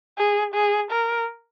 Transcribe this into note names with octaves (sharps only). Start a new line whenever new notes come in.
G#4
G#4
A#4